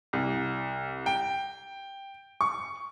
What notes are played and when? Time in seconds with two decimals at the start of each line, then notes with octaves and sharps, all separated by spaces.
0.13 C2
1.06 G5
2.41 C#6